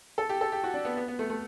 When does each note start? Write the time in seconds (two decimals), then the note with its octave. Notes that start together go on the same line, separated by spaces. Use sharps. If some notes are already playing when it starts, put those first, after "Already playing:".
0.18 A4
0.29 G4
0.41 A4
0.52 G4
0.64 F#4
0.74 D4
0.85 B3
0.97 B3
1.08 B3
1.19 A3
1.30 A3